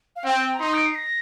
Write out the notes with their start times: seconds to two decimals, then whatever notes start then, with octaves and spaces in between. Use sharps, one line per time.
0.16 F5
0.24 C4 G5
0.54 A#5
0.60 D#4 C6
0.74 D7
0.85 C7
0.95 A#6